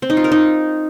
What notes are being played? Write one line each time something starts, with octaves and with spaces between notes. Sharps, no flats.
C4
D#4
F4
A#4
D#4